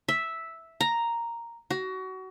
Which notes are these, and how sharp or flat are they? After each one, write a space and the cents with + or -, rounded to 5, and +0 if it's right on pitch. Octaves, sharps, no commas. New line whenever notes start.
E5 -5
A#5 +0
F#4 +25